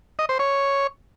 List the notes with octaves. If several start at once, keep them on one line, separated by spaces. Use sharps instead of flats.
D#5
C5
C#5